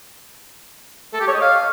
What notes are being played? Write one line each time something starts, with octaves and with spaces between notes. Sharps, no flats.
A4
G4
C#5
D#5
F5